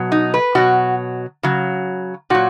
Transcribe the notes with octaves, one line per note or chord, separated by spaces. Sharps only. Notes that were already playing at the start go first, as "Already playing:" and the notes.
Already playing: B2 F#3
D#4
B4
B2 F#3 F#4
C#3 F#3
A#2 F#3 F#4